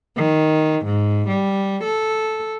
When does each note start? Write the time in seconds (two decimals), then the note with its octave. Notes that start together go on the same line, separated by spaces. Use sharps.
0.15 D#3
0.84 G#2
1.27 G3
1.81 A4